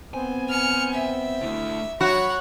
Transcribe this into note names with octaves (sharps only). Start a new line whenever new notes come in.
B3 C4 C5 G#5
F6 C#7
E5
D3 A3 E4
F#3 F#4 C#5 F#5 B5